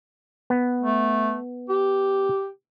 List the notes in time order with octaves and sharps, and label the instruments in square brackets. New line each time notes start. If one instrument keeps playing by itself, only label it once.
[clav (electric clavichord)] B3
[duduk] A3
G4